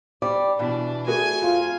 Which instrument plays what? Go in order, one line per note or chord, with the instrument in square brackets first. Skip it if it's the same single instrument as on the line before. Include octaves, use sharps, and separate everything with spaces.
[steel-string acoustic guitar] G3 G4 D5
[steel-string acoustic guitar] B2 E3 [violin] D4
[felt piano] A3 F#4 G#4 [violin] G#5
[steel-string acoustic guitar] F2 [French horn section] F4